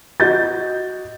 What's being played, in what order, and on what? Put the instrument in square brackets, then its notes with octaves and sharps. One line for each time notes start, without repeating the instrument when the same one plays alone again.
[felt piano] F#4 D#5 G6 A6